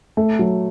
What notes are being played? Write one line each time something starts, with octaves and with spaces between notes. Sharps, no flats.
A3
F#3